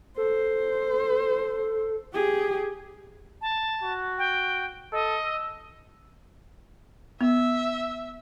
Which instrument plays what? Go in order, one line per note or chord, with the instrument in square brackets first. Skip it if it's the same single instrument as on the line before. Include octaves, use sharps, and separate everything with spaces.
[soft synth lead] A4 [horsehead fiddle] C5
[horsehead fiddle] G4 G#4
[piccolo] A5
[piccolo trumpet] F#4
[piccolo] G5
[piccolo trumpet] A4 [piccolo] D#5
[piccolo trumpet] E6
[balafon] B3 [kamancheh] E5